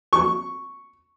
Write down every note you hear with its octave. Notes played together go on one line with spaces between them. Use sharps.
C#6